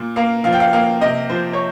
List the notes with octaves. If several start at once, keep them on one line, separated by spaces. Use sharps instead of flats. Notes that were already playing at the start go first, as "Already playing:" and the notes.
Already playing: A#2
A#3 F5
F3 F5
G5
F5
A#3 F5
C3 D#5
F3 C5
C#5